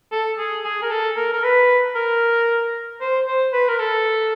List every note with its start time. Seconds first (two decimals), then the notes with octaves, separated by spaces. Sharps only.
0.12 A4
0.38 G#4
0.64 G#4
0.82 A#4
0.90 A4
1.17 A#4
1.33 A#4
1.43 B4
1.95 A#4
3.01 C5
3.27 C5
3.53 B4
3.68 A#4
3.79 A4